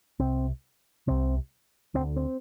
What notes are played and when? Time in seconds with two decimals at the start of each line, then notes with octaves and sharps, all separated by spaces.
0.19 C2 C3 C4
1.07 C2 C3 C4
1.94 D2 C4
1.99 D3
2.16 C4